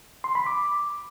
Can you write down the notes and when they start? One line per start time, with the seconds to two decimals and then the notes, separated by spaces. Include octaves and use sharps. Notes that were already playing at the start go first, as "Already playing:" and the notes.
0.24 C6
0.35 B5
0.46 D6